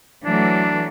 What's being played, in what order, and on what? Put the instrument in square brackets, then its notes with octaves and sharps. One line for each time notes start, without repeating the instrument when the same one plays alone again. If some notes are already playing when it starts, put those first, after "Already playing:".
[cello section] E3 F#3 A3 [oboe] D4